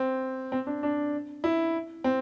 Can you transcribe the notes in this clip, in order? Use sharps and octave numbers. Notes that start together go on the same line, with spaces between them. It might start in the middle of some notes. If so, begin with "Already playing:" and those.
Already playing: C4
C4
D4
D4
E4
C4